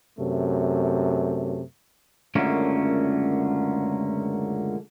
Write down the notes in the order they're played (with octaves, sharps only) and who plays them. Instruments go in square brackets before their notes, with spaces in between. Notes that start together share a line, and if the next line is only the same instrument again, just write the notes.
[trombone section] F#2 C3 A3
[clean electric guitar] C#2 F#2 D3 A3 A#3 C#4